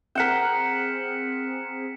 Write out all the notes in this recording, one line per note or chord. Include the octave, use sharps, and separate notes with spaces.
C4 G#4 A#4 F#5 G5 B6 C#7 E7